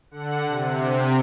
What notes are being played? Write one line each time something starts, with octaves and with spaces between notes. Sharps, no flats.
D3 F#5
C3